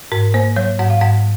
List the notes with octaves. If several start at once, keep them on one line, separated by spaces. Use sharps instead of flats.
G#2 A#4
A#3 C5
F#3 C#5
G#2 F#5
F5
G#2 F#5